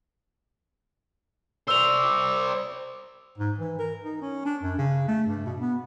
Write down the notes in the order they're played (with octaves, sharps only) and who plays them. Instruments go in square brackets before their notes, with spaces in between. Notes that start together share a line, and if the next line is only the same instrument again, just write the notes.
[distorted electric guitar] C5 D5 [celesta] E6 F7
[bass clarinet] G#2
E3
A#4
D#4
C#4
D4
F#2
C#3
A3
G2
B2
B3